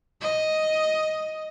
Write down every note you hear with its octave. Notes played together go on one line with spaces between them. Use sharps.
D#5